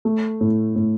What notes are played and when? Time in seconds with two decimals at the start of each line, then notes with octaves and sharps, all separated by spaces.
0.05 A3
0.41 A2
0.76 A2